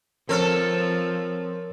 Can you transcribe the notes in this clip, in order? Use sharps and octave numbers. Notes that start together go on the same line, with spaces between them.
F3 C4 A4 A#4 C#5 F6